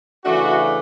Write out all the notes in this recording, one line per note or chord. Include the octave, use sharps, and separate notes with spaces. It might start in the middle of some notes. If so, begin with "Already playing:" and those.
C#3 E3 A3 D4 F#4